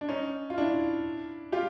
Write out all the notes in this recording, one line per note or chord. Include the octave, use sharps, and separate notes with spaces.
D4
C#4 D#4
F4
D4 E4
F4 G4